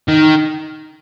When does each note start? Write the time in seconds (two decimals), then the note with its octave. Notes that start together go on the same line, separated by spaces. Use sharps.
0.08 D#3